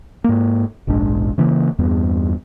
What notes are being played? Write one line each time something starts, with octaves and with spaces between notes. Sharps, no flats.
G#2 A#3
F1 A#1 G#2 D4
C#3 E3 A#3
E2 G2 B3